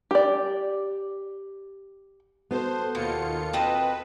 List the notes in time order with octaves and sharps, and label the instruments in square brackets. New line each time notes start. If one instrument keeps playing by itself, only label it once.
[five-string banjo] G4 D5
[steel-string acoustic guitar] B3 F#4 A4 [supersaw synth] C5
[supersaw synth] D#2 F4 C#7 [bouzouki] B2
[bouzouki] C4 D#5 A5 [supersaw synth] B4